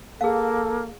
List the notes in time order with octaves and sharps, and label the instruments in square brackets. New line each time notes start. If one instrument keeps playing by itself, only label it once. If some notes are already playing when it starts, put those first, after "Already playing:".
[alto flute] A#3 [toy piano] G#4 F5 [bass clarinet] A4